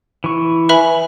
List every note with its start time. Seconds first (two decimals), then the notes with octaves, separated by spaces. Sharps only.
0.24 E3 C#6
0.69 B4 E5 G#5 B5